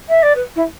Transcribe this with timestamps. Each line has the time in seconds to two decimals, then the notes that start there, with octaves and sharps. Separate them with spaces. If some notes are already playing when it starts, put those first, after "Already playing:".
0.09 E5
0.22 D5
0.35 B4
0.56 E4